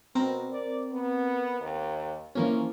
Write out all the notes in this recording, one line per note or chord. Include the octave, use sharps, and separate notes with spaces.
B2 C4 A#4
D5
B3
D#2
E3 F3 A#3 C#4